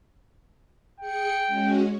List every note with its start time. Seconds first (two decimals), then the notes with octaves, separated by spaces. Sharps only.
1.00 G#4 G5 C#7
1.47 G#3 C#4 F#4